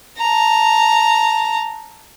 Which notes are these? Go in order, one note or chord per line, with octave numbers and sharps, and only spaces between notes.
A5 A#5